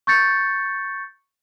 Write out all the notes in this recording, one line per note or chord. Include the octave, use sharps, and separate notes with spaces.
C#6 G6 A6 C#7